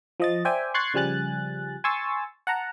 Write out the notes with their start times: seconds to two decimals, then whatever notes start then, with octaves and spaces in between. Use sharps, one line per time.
0.20 F3 D#5 A6
0.45 C5 D5 E5 G5 G#5
0.74 C6 C#6 F#6 G#6 A6 C7
0.94 C#3 F3 G3 G#5 F#6 A6
1.84 G#5 C6 C#6 E6 A6
2.47 F#5 A5 A#5